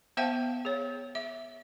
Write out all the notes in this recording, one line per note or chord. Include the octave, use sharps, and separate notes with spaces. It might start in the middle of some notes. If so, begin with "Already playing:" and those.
B3 C5 E5 F5 G5 A5
G#4 C#5
E5